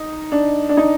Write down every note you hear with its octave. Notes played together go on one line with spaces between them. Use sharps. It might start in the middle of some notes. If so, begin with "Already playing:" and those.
Already playing: D#4
D4
D4
D#4